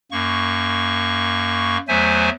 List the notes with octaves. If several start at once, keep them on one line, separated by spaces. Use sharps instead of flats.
F#2 A#3 C#6
E2 F#3 A3 C5 E5 G#5